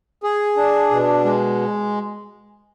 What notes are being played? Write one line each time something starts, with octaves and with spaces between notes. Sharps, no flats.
G#4
D4
B2
G#3